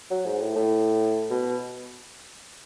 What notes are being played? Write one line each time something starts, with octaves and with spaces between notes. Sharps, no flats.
F#3
G#2
A2
A2
B2